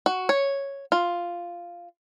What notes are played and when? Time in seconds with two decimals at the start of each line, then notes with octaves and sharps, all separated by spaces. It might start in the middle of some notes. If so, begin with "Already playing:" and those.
0.06 F#4
0.29 C#5
0.92 F4